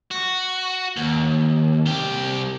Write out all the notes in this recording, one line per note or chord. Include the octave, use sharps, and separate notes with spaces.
F#4
D#2
C2 G4